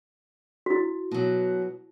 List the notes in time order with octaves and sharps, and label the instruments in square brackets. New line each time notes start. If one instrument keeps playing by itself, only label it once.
[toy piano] E4 F#4
[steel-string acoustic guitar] B2 F#3